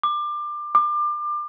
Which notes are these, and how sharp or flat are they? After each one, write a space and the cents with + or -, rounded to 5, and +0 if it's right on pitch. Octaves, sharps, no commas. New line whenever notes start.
D6 +25
D6 +30